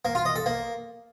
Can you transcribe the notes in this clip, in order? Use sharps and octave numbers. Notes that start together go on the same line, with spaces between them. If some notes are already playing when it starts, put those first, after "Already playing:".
A#3
F4
D#5
A4
A#3